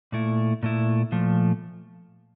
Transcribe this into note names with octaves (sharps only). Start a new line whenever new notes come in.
A#2 A3 E4
A#2 A3 E4
A#2 F3 A3